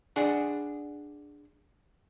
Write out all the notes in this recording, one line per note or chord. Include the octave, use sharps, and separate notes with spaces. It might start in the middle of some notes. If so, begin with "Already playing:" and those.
D4 G#4 F#5